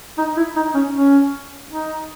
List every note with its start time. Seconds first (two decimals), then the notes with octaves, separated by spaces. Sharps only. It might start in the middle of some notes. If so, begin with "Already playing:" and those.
0.18 D#4
0.37 E4
0.56 D#4
0.74 C#4
0.94 C#4
1.70 D#4